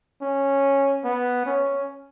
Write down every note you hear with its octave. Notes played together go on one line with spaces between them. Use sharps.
C#4
B3
C#4